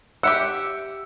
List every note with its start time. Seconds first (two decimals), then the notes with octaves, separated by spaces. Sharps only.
0.23 G4 E5 F#5 E6 C#7